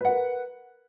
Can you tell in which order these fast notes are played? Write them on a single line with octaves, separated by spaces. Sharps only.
B4 F#5 A#4